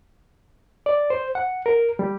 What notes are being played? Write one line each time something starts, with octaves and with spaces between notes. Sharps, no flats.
D5
C5
F#5
A#4
G3